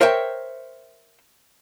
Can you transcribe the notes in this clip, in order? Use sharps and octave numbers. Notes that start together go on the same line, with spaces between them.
A#4 C5 C#5 E5 G5